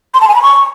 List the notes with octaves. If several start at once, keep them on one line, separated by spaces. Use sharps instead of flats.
C6
A5
G#5
B5
C#6